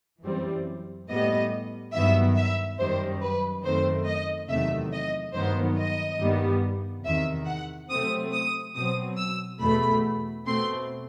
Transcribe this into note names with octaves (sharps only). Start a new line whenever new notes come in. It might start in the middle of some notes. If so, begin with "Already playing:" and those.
F#2 E3 G3 C4
A2 G3 B3 D#5
G2 D#3 F#3 B3 E5
E5
F#2 D#3 G3 C5
B4
F#2 D#3 A3 C4 C5
D#5
E2 C3 D#3 F#3 A3 E5
D#5
G2 D#3 F#3 B3 C5
D#5
G2 D#3 G3 B3
E2 C3 D#3 E5
F#5
C3 F#3 A3 C4 D#6
D#6
B2 F#3 C4 D#6
E6
E2 B2 A3 B5
B2 A3 C4 C6